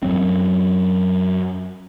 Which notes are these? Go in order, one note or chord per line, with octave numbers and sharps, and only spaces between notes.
F#2 F#3 C4